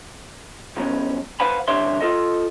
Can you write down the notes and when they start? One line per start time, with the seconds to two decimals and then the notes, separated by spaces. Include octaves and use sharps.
0.77 G#2 F#3 B3 C#4
1.40 B4 C5 F5 F#5 G#5 B5
1.68 C2 D3 G4 C#5 E5 C6
2.01 F4 A4 D#5